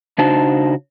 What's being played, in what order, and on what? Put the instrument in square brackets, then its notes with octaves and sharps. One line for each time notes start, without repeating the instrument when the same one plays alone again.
[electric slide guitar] C#3 D4 D#4 F#4 C5 A5